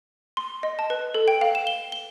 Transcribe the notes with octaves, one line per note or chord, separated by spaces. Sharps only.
C6
D#5
A5
B4
A4
G5
F5
E7
G7
G7